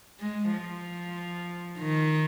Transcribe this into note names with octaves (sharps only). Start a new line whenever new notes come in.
G#3
F3
D#3